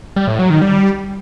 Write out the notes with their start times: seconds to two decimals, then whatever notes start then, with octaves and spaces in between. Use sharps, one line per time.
0.16 G3
0.28 A2
0.39 F#3
0.50 D#3
0.62 G3